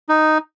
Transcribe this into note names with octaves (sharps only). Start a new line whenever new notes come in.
D#4